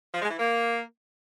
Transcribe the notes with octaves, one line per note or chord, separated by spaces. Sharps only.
F3
G#3
E3
A#3